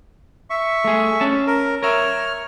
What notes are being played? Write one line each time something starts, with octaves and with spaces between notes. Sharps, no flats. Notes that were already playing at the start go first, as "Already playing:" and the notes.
E5 C#6
A3 G#4
C#4 A5
A#4
A#4 C#5 E5 F6